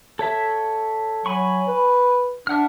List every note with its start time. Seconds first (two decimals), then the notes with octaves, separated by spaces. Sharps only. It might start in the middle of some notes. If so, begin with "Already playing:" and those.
0.19 A4 C#5 E5
1.26 F#3 G#5 B5 C#6
1.68 B4
2.47 D4 E5 F#5 F6